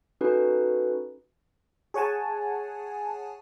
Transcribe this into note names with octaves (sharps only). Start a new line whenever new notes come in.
C#4 D#4 F#4 A4 B4
G#4 C#5 F#5 G#5 A5